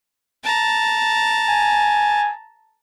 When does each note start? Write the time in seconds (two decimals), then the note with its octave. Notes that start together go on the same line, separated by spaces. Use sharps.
0.44 A5 A#5
1.48 G#5